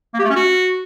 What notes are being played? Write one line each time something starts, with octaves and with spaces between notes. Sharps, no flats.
A#3
G4
A3
C#4
F#4